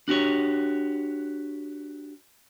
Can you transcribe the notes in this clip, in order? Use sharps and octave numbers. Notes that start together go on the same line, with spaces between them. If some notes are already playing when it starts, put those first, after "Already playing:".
D4 F#4 G4 C#5